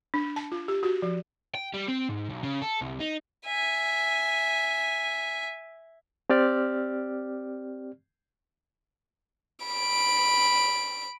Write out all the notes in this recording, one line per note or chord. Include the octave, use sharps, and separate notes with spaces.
D4
A5
F4
G4
F#4
F3
G5
G3
C4
G#2
B1
C#3
A4
C2
D#4
E5 G#5
C4 G4 D5 F6
B5 D7